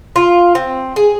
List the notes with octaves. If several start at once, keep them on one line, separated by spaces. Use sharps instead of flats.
F4
C4
G#4